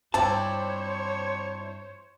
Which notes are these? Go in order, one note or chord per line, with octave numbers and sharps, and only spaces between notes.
G2 C4 D4 E4 C5 C#5 A5